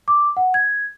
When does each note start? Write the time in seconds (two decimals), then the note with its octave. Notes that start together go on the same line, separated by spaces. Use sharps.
0.08 D6
0.37 F#5
0.54 G#6